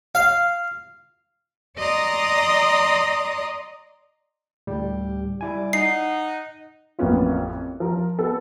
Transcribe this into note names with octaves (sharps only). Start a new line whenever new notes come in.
F5
D5 D#5 A#5 C6 D#6
D2 A2 G3 G4
G3 E4 D5 G#5
D#4 D#5 F#5 C7
A1 F2 A#3 B3 C#4 F4
F3 A#4
B3 A4